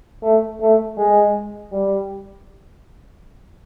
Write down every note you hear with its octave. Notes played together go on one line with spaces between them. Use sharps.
A3
A3
G#3
G3